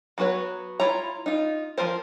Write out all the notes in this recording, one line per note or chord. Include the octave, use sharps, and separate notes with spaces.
F#3 B3 F#4 B4 C#5
E4 F4 C#5 A#5
D#4 F4
F3 F4 A#4 C5